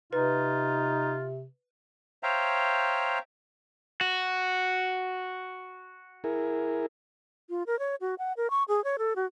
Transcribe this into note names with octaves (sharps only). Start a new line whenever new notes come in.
C3 D#4 F4 B4
C5 C#5 E5 F5 G5 A#5
F#4
E4 G#4 A#4
F4
A#4
C#5
F#4
F#5
A#4
C#6
G#4
C#5
A4
F#4